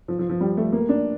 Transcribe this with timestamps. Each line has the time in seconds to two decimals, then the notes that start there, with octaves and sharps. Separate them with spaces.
0.08 F3
0.19 F3
0.29 F3
0.41 G3
0.57 A3
0.72 A#3
0.89 D4